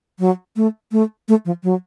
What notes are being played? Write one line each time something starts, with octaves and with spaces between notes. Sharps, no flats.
F#3
A3
A3
A3
F3
F#3